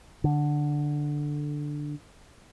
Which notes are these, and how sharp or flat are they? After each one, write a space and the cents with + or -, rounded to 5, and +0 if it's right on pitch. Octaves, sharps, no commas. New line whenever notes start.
D3 +5